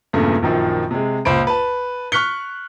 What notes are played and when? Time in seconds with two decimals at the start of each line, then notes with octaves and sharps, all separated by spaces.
0.13 E2 G2 A#2 C#3 A3
0.42 A#1 F#2 D#3 F3
0.91 C3 G#3
1.25 C#2 A#2 C5 B5 D7
1.47 B4 A5
2.12 C#6 F6 F#6 B6 C#7 G7